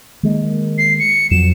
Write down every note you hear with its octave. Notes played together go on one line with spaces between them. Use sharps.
D#3 G#3 A#3
C7
C#7
F2 F#3 E7